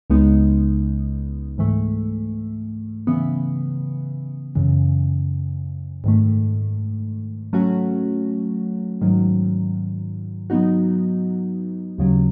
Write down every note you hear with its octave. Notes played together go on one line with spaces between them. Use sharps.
C#2 C#3 G#3 B3 D#4
G#2 E3 A3
C#3 E3 B3
F#2 C#3 E3
G#2 D#3 A3
F#3 A3 C#4 F#4
G#2 D#3 F#3
F#3 B3 D#4 F#4
D#2 C#3 F#3